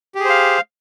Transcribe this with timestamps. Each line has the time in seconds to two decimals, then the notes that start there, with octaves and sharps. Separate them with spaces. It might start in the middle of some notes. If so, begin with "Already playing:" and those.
0.15 G4
0.20 G#4
0.25 C5
0.30 F5